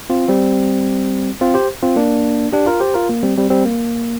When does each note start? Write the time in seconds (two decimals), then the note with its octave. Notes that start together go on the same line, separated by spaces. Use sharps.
0.10 C4 F4
0.28 G3 C4
1.41 C4 F4
1.54 G4 C5
1.83 C4 F4
1.96 A#3 D4
2.53 D4 G4
2.66 F4 A#4
2.80 G4 C5
2.94 F4 A#4
3.09 A#3
3.23 G3 C4
3.37 G3 C4
3.50 G3 C4
3.65 A#3